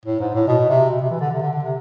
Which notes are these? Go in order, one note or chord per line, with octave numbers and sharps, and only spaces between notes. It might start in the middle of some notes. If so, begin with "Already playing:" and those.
A2
G#2
A2
B2
C3
B2
C3
E3
D3
C3
D3
D3
C3